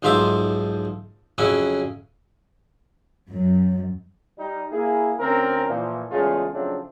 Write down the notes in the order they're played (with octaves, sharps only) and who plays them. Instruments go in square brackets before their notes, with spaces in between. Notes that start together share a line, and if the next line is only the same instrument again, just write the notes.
[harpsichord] B1 G#2 F3 C5 E5 D6
F2 C#3 F#3 C#4 E4
[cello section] F#2
[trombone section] G3 D#4
A#3 E4 G#4
D2 C4 C#4 A#4
A#2 E3 F3
E2 C#3 G#3 A3 F4 G#4
C#3 F3 F#3 A3 C4 D4